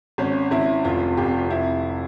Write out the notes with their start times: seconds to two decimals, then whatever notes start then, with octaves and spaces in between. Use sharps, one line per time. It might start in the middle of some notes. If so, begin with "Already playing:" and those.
0.18 G#1 C#4
0.51 G#1 E4
0.84 F1 F4
1.17 F1 G4
1.50 E4